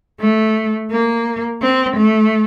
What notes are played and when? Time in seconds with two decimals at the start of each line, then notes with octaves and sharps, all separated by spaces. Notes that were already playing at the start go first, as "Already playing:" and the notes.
0.20 A3
0.91 A#3
1.62 C4
1.97 A3